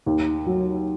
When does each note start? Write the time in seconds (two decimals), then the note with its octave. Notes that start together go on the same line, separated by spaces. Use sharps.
0.06 D#2
0.46 F#3